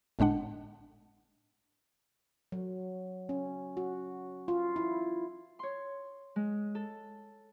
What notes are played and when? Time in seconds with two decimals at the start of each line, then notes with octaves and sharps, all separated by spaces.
0.19 G1 A2 G#3 D4 F#5
2.52 F#3
3.29 C#4
3.77 F#4
4.48 F4
4.76 E4
5.59 C#5 C6
6.36 G#3
6.75 A4